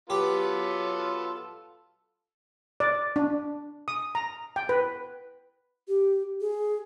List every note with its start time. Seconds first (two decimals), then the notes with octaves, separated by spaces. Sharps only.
0.10 F#3 B3 F4 G4 A4 B4
2.80 D5
3.16 D4
3.88 D#6
4.15 A#5
4.56 G5
4.69 B4
5.88 G4
6.41 G#4